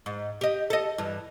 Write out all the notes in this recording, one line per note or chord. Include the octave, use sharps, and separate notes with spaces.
G#2
G4 D#5
A4 D#5
G2 E3